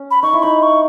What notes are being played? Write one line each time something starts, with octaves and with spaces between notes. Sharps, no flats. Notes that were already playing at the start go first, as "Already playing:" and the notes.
Already playing: C#4
B5
D#4 C#6
E4
D#4 B5
C#6